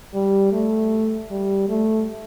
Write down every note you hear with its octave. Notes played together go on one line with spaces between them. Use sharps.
G3
A3
G3
A3